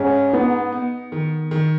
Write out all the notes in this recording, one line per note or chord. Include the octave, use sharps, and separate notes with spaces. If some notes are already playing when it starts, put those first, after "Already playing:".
Already playing: G#2 C#4
B3 D#4
B3
D#3
D#3